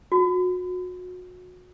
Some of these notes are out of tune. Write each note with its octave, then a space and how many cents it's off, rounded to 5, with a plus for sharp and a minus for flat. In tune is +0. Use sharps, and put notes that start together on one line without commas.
F#4 -30